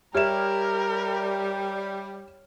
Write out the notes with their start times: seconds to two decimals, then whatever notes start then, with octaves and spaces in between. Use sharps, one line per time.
0.15 G3 G4 A#4 C#5 E5 F6 E7